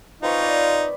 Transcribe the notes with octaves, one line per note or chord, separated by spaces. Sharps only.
C4 D#4 F4 B4 C#5
D5